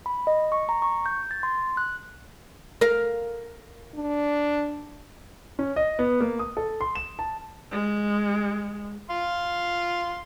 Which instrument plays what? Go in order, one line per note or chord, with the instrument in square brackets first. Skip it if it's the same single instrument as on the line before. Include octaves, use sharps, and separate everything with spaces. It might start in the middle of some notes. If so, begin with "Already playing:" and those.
[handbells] B5
D#5
C#6
A#5
C#6
G6
A6
C6
F#6
[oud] A#4 F5
[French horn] D4
[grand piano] C#4
D#5
B3
A#3
D#6
A4
C6
E7
A5
[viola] G#3
[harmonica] F5 C6